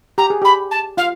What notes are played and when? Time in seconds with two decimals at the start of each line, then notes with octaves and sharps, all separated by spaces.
0.18 G4 A#5
0.30 G#4
0.42 G4 B5
0.71 A5
0.97 F4 F5